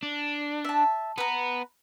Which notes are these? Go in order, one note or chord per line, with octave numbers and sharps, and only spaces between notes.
D4
E5 A5
B3 B4 A#5